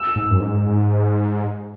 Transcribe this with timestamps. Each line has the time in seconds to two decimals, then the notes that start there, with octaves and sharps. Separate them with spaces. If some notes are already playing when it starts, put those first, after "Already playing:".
Already playing: E6
0.16 G#2
0.30 F#2
0.40 G#2